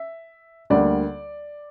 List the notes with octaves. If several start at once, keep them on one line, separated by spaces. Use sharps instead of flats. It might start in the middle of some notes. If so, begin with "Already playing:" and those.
Already playing: E5
D2 D3 G3 A#3 D5